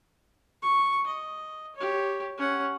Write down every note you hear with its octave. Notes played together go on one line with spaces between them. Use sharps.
C#6
D#5
G4 C#5
C#4 F#5